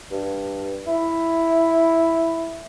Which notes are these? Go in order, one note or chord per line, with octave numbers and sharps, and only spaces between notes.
G2
E4